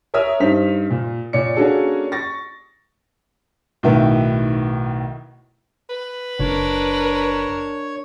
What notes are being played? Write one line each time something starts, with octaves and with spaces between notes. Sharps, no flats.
A#4 C#5 E5 D#6 F6
G2 D#4 C5 B6 F7
A#2
A#2 C#5 D5 C#7
A#3 C#4 D4 F#4 G#4 A4
C#6 A6 A#6
B1 A2 D#3 E4 B4
B4
F#1 D4 A#4 C#5